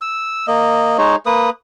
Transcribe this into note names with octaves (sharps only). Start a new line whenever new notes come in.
E6
A#3 D#5
G#3 D#4 C#5
A#3 B4 D#6